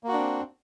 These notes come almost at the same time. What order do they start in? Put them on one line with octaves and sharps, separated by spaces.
A#3 F#4 D4 C4